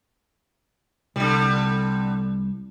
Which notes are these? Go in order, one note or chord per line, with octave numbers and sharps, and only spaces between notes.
C2 D3 G3